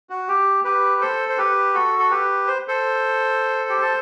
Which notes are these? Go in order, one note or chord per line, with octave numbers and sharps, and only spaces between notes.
F#4
G4
G4 B4
A4 C5
C5
G4 B4
F#4 A4
A4
G4 B4
C5
A4 C5
G4
A4